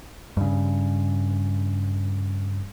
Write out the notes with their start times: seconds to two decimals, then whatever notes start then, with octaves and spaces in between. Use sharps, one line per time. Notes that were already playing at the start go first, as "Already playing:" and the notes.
0.37 G2 C#3